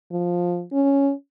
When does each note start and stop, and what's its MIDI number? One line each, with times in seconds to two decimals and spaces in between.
0.11 0.63 53
0.72 1.12 61